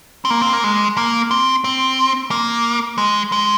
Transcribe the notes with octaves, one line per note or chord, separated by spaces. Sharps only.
C4
A#3
C4
A#3
G#3
A#3
C4
C4
A#3
G#3
G#3